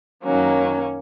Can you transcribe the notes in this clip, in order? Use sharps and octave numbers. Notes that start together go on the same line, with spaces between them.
F#2 D#3 F#3 A#3 C#4